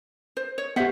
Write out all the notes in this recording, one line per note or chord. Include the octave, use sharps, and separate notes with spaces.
C5
C#5
B3 G4 C5 E5 F#5